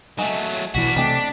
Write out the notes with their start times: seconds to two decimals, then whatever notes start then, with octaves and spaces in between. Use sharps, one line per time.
0.19 F#3 G#3 A3
0.75 B1 B2 E3 D4 F#4 B6
0.96 C3 G#3 A3 D4 G4